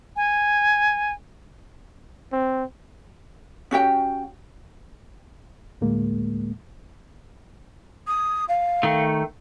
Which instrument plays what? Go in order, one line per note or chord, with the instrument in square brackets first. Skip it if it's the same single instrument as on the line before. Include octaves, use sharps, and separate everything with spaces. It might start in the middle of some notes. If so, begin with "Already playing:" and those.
[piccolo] G#5
[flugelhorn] C4
[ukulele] C#4 F#4 G4 G5
[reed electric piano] D2 A2 G#3 A#3
[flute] D#6
F5
[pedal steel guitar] D#3 A3